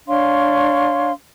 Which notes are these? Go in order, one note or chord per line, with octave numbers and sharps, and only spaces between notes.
D4 C#5 F5 C6